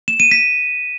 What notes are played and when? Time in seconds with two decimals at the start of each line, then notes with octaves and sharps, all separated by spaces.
0.08 E7
0.20 D#7
0.32 B6